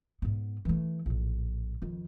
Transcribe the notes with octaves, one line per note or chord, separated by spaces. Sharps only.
G#2 B3
E3 A3
A#1 A2
F2 D#3